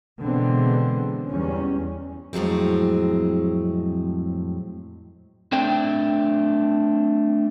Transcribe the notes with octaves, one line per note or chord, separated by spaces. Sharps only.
B2 D3 E3 G#3 B3 C4
E2 G3 C#4
F2 A2 F#3 G#3 C4
A3 C4 D4 G5